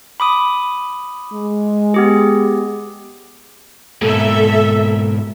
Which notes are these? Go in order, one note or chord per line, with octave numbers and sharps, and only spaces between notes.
B5 D6 D#6
G#3
B3 G4 G#4
G#2 B2 A#3 A4 E5